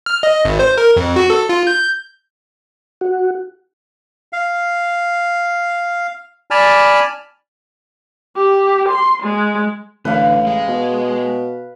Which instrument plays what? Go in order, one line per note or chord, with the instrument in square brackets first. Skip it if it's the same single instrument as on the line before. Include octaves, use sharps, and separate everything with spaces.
[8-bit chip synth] F6
D#5
G#1
C5
A#4
F2
F#4
A4
F4
G6
[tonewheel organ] F#4
[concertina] F5
D5 G#5 A5 B5 F6
[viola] G4
C6
G#3
[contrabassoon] A1 [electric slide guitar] D3 [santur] B4 F5
[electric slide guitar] G#3
[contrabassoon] B2